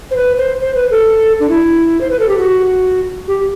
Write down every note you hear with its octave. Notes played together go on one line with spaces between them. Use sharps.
C5
B4
C5
C5
B4
A4
D4
E4
C5
B4
A4
G4
F#4
G4